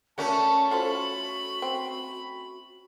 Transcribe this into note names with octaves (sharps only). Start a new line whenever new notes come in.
A3 C#4 F#4 A#4 D5 A5
F4 F#4 A4 C5 B5
C4